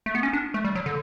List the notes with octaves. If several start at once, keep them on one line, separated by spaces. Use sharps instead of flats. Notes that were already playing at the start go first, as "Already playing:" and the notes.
A3
B3
C#4
D4
A3
G3
F#3
D3